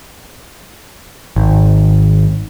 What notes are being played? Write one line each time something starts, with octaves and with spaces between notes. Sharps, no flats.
G#1